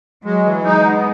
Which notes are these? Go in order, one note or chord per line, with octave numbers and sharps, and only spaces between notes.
F#3 G#3
E3
G#3 D#4
B3